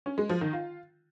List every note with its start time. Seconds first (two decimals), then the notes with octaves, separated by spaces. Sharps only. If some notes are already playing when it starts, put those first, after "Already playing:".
0.06 C#4
0.18 G#3
0.29 F3
0.41 D#3
0.53 F4